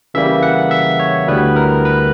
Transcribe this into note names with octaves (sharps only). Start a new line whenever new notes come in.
C#3 E3 G3 A#3 E5
F#5
E5
C#5
D2 D3 G3 B3 E4 B4
A#4
B4